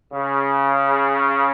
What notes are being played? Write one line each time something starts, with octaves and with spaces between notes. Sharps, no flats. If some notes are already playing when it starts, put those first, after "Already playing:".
C#3